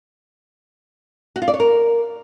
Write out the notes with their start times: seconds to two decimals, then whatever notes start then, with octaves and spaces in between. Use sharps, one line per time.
1.36 F#4
1.42 F4
1.48 D5
1.54 C#5
1.60 A#4